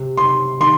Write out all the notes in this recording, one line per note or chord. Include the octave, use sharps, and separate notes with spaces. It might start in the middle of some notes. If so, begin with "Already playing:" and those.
Already playing: C3
C3 C6
D#3 C6